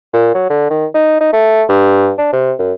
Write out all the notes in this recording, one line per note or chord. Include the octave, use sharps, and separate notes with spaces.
A#2
F#3
D3
D#3
D#4
D#4
A3
G2
D4
C3
F#2